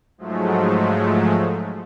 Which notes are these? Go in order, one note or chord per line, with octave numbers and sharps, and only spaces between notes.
G#2 F3 F#3 G#3 A3